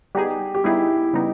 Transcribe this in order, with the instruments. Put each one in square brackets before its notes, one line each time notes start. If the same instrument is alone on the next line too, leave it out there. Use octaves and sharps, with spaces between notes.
[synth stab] G3 B3 D#4 G#4 [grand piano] G4
[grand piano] G4
[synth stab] G3 B3 D#4 G#4 [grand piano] E4
[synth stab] C#3 G3 B3 D#4